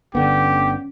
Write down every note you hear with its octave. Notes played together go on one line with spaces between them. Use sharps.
G1 D3 B3 C#4 G4